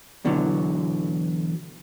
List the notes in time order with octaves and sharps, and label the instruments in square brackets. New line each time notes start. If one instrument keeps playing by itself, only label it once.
[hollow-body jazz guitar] E2 B2 D3 E3 F#3